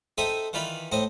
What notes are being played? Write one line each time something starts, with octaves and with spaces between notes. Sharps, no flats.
C4 D#4 A4 E5 C6 D#6
D#3 E3 F4 D5 B5
A2 C4 C5 D#5